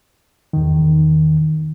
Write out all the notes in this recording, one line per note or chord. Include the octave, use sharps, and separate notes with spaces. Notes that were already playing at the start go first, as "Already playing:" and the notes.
E2 D#3